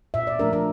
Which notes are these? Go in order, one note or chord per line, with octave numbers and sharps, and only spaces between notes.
A#2 E5
D5
F3 A3 D4 A#4
A#4